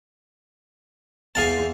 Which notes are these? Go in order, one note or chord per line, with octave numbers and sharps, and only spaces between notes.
E2 G#4 F5 A5